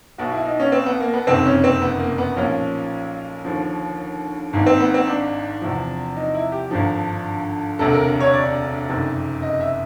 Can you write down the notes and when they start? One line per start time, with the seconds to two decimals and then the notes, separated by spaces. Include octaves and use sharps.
0.18 B1 B2 F#4
0.32 E4
0.45 D#4
0.60 C#4
0.72 C4
0.86 B3
1.00 A#3
1.14 B3
1.27 F#1 F2 C3 D#3 C4
1.45 C#4
1.64 C4
1.81 B3
1.99 A#3
2.18 B3
2.36 B1 A#2 F3 C#4
3.45 D#2 D3 F3
4.53 G#1 G#2 D#3
4.66 C4
4.80 B3
4.94 C4
5.07 D4
5.62 E2 C3 F3
6.16 D#4
6.34 E4
6.52 G4
6.71 G#1 G2 D3 F3
7.79 E1 D2 C3 A4
7.93 A#4
8.20 C#5
8.34 D5
8.88 F#1 F2 C3 D#3
9.42 D#5
9.61 E5